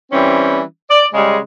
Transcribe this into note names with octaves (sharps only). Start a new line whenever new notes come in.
E3 G3 C4 C#4
D5
C#3 G3 G#3